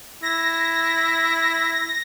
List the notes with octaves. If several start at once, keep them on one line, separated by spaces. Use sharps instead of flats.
E4 A#6